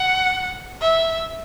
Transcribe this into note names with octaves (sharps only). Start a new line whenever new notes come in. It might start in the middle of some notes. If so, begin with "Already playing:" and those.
Already playing: F#5
E5